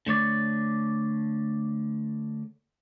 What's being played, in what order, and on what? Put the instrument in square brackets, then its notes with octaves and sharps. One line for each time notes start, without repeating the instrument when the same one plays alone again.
[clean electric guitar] D3 A3 C#5 D5